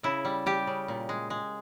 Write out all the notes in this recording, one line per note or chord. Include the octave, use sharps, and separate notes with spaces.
C#3 E4
G3
G3 G4
C#3
A#2
G#3
G#3